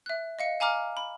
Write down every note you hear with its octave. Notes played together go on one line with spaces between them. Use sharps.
E5 F#6
D#5 F5 C#7
F5 G#5 A#5 D6 F6
B5